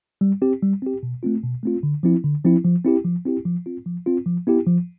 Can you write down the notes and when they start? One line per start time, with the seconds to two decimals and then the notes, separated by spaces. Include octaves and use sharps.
0.21 G3
0.42 C4 G4
0.62 G3
0.82 C4 G4
1.03 B2
1.23 A3 C4 F4
1.43 B2
1.63 A3 C4 F4
1.83 D3
2.03 F3 C4 E4
2.24 D3
2.45 F3 C4 E4
2.65 F3
2.85 C4 E4 G4
3.05 F3
3.26 C4 E4 G4
3.45 F3
3.66 C4 F4
3.86 F3
4.06 C4 F4
4.26 F3
4.47 B3 E4 G4
4.67 F3